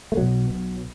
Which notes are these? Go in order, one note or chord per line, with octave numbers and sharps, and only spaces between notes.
A3
B1 B2 F#3
B1 B2